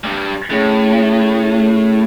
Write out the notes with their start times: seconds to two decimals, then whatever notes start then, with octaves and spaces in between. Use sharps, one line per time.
0.04 G2 G3
0.50 A2 C#4 G#4 C#5